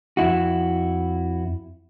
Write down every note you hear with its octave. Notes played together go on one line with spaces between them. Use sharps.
F2 E4 F#4